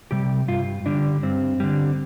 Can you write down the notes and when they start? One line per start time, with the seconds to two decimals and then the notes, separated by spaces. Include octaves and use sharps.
0.11 C3 G3 G4
0.48 G2 F4
0.86 D3 G3 D4
1.23 G2 C4
1.60 D3 G3